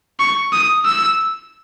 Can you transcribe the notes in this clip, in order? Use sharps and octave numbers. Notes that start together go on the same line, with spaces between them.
C#6
D#6
E6